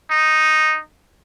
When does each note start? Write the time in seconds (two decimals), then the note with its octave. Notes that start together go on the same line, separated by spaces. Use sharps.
0.11 D#4